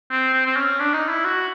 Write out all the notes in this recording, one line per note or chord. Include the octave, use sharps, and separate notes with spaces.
C4
C4
C4
C#4
D4
D#4
E4
F#4